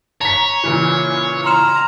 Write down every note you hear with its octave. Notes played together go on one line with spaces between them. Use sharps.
C#5 A#5 B6
A#2 C#3 E3
A#5 C6 F6 E7